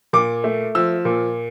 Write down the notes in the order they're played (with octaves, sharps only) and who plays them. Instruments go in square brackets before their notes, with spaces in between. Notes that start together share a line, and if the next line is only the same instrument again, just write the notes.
[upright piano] A#2 D6
A3
F3 E6
A#2